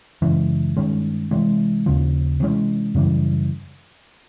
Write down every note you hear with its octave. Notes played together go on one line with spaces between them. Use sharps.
F#2 C#3 E3 G#3
G2 D#3 G#3 C#4
C3 E3 G#3
D#2 C#3 F3
C3 E3 G#3 C#4
F#2 C#3 E3 G3